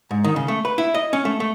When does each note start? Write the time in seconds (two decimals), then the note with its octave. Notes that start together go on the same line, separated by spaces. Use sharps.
0.11 G#2
0.24 D#3
0.36 C#3
0.48 A3
0.65 B4
0.78 E4
0.94 D#5
1.13 C#4
1.25 A3
1.40 A3